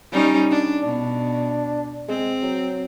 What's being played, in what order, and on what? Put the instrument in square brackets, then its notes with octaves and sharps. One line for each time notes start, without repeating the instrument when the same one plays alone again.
[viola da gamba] G3 C#4 D#4
D4
[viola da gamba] B2 [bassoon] D4
[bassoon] G#3 [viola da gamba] C4
[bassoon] F#3